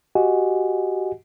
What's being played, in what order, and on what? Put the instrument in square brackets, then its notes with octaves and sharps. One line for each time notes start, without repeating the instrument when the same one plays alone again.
[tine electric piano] F#4 G4 D#5 F#5 G#5